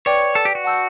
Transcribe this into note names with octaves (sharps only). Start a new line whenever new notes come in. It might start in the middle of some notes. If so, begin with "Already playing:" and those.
B4 C#5 D5 G5 D6
A4
G4
F#4
F#5 A5 E6 G6